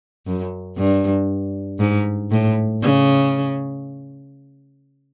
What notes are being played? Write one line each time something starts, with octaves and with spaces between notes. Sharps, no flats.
F#2
G2
G#2
A2
C#3